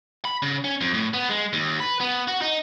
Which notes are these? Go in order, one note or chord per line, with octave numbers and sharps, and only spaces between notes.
B5
C#3
C#4
F2
A2
B3
G#3
D#2
B4
B3
F#4
D#4